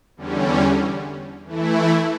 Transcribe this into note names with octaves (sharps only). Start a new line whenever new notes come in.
E2 D3 G3 C#4
E3 A3 E4